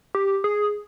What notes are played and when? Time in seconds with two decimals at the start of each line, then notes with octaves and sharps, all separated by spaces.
0.15 G4
0.44 G#4